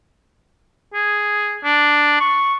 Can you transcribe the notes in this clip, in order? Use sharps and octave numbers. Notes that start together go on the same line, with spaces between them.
G#4
D4
C#6